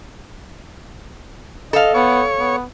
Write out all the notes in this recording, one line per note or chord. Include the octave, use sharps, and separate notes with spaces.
A4 D#5 F5
B3 C#5
B3